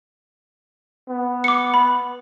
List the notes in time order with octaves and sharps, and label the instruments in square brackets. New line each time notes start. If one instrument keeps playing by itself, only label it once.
[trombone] B3
[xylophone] D6 C#7
B5